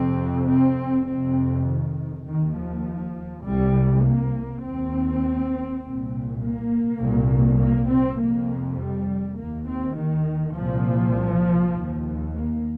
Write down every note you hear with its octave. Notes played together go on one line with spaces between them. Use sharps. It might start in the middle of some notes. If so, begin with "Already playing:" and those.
Already playing: F2 C3 C4
C4
F2 C3 C4
D#3
D#2 D#3
F3
C2 C3 G3
A#3
D#2 C4
C2 A#2
A#3
C2 A#2
A#3
C4
F2 C3 A#3
G3
D#2 A#3
C4
D#3
C2 A#2 F3
D#2
A#3